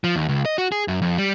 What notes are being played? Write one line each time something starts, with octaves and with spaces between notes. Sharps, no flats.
F3
D#2
C#2
D#5
F#4
G#4
F#2
F2
G3